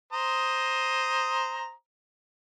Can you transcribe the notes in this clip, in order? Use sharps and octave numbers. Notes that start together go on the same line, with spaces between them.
C5 A#5 D#6